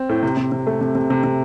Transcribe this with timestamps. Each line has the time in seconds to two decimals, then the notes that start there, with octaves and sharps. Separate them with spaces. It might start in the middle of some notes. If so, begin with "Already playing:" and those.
Already playing: C4
0.09 A2
0.23 C3
0.37 C3
0.52 C3
0.67 A3
0.81 C3
0.95 C3
1.10 C3
1.24 C3